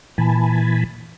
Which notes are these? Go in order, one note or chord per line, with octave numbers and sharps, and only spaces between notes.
A#2 E3 G#5 A5 B5